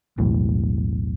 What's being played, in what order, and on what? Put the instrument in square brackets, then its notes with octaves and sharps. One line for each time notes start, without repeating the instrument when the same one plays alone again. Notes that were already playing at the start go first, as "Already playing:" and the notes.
[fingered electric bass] E1 B1 E2 A2